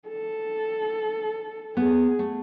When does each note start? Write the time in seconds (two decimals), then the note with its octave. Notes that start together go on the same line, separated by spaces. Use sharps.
0.08 A4
1.77 B3 G#4
2.19 A3